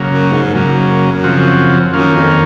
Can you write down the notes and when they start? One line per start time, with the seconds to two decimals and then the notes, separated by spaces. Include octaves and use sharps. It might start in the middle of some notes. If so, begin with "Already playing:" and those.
Already playing: C#3 F#3 A#3
0.09 F#2
0.32 G#2
0.55 F#2 C#3 F#3 A#3
1.24 C#3 F3 C4 F#4
1.93 F#2 D#3 A#3 C#4 F4
2.15 F2